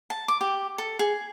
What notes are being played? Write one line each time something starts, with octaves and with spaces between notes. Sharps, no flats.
A5
D6
G4
A4
G#4